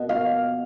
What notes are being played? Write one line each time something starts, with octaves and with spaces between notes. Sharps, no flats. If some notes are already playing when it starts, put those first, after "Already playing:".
Already playing: B2
F5